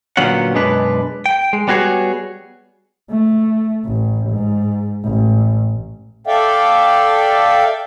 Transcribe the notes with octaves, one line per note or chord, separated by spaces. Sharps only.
A#2 D3 F#3 B3 C#4 F#5
F#2 B2 G#3 D4 B4
G5
G#3
G3 B3 F#4 G#4 C#5
A3
A1
G#2
A1
A4 D5 E5 F5 G5